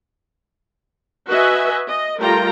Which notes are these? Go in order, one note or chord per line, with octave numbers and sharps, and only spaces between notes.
F#4 B4 D#5 E5 G#5
D#5
G3 A3 F4 A#4 G5 A#5